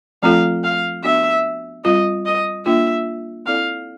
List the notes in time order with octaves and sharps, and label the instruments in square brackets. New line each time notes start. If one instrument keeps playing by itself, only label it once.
[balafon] F3 A3 C4 F4 A4 [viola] F5
[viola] F5
[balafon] B3 D4 F#4 [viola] E5
[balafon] G3 C4 F4 [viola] D#5
[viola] D#5
[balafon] A#3 D4 F4 [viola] E5
[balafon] C4 E4 A4 D5 [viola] F5